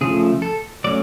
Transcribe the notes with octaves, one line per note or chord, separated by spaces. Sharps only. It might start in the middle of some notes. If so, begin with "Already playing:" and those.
C#3 F3 A3 G#4
A4
F#3 A3 C#4 D5